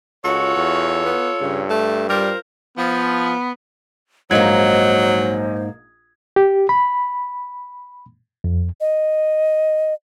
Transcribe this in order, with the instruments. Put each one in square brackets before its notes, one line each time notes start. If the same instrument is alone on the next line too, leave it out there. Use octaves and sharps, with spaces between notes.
[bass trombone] C#2 [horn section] F4 A4 C#5 [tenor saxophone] F#4
[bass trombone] E2
[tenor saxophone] B3
[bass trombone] G2 [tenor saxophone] C#3
[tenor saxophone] A3
[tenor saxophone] G3 [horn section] F4 A#4 C5
[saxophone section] F3 [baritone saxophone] B3
[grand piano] A#1 D#4 G#6 [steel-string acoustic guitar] G#2 A#3 [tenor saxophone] F#3 [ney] C5
[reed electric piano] G4
B5
F2
[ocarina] D#5